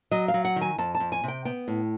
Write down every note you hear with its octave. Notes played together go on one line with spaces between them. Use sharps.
F#3 D#5
F5
F#3
F#5
D#3
G#5
F2 A5
A5
F2
G#5
C3 G5
B3 G5
A2